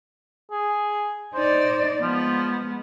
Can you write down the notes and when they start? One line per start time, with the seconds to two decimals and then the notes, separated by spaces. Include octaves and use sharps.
0.51 G#4
1.34 D#4 C5 D5
2.02 F3 G#3 B3